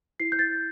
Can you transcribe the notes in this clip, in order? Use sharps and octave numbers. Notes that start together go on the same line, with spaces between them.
E4 C7
G6
A6